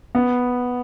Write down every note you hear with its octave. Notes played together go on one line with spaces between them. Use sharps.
B3